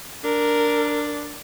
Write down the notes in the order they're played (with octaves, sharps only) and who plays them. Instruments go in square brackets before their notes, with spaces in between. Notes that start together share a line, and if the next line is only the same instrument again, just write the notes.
[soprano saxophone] D4 [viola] A#4